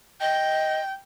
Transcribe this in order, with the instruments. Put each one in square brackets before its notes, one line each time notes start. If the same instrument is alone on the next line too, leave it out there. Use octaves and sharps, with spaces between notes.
[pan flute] D#5 [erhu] G5